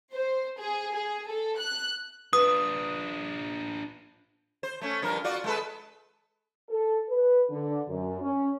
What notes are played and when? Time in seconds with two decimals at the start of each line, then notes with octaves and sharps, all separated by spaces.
0.14 C5
0.60 G#4
0.95 G#4
1.29 A4
1.59 F#6
2.33 D4 F4 B4 D#6
4.63 C5
4.81 A3 C#4
5.02 G2 F3 A#4
5.24 F4 F#4 D5
5.44 G#3 A4 B4
6.69 A4
7.09 B4
7.50 D3
7.89 F#2
8.21 C#4